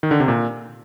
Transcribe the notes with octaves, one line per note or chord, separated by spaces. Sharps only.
D#3
D3
C3
A#2